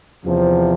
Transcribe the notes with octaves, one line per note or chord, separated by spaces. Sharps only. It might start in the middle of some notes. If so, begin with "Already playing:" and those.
E2 C3 F3